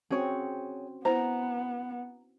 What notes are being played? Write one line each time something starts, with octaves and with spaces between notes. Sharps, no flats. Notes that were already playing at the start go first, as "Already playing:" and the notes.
C4 C#4 F#4 G#4 C#5
B3 E4 C5 A#5